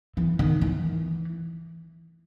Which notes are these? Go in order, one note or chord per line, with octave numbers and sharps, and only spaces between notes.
E3
D#3
E3